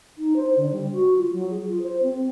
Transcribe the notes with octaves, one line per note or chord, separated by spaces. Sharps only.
D#4
C5
D3
G3
F#4
F4
F#3
G#4
F4
C5
C4